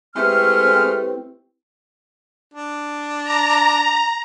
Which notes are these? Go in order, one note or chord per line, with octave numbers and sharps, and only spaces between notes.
G#3 A3 C4 E4 G4 B4 F6
D4
A#5